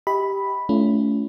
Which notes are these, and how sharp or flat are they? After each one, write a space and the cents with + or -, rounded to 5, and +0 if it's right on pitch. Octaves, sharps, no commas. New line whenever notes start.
G4 +0 D#5 +30 B5 +0
A3 -15 C#4 +30 F4 -35